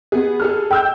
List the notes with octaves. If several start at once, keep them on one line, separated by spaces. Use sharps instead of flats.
B3 G#4
G#4 A4 F6
G5 E6 G6